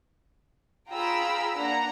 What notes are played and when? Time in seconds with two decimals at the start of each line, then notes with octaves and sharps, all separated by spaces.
0.90 F4 G#4 G5 A#5 B5 E6
1.57 A#3 D4 F#5 A#5